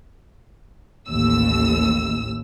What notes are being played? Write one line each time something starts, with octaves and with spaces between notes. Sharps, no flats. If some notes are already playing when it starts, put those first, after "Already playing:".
A1 D#2 E6